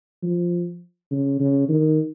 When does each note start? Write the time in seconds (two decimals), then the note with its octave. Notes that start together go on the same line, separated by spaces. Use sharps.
0.23 F3
1.11 C#3
1.40 C#3
1.69 D#3